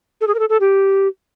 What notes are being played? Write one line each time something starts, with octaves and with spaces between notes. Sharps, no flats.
A4
G#4
A#4
A4
A4
G4